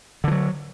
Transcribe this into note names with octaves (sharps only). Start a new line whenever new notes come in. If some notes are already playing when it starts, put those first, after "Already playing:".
D3 E3 F#3